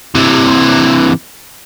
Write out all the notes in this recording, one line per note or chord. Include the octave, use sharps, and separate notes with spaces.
C3 E3